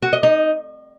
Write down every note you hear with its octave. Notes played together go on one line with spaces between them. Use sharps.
F#4
D#5
D#4